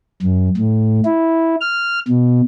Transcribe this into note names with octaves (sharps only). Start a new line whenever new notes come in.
F#2
A2
E4
F6
B2